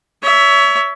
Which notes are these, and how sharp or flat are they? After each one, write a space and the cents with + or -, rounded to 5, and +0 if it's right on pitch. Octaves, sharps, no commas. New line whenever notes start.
C#5 +30 E5 +0